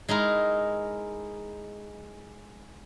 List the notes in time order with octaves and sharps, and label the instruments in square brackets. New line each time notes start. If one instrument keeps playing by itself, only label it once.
[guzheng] G#3 D#4 E4 A#4